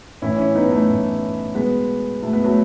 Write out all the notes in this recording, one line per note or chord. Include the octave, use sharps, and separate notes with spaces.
A2 E3 C#4 E4
C#4 E4
B3 D#4
A3 C#4
A2 E3
B2 G#3 B3
B2 A3
B3
F#3 A3